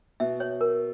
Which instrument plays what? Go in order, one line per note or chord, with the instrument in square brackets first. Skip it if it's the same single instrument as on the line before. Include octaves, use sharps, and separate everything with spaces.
[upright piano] B2 [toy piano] E5
[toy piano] C#5
A#4